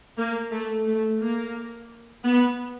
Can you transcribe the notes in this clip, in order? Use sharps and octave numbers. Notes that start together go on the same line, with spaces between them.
A#3
A3
A3
A#3
B3